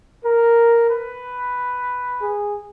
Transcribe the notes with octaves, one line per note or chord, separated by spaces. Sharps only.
A#4
B4
G#4